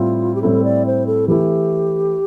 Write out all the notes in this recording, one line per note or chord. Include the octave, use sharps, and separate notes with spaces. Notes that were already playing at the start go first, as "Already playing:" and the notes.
Already playing: A2 G3 C4 E4 F4
G4
A2 G3 C4 E4 A4
D5
C5
A4
E3 A3 E4 G4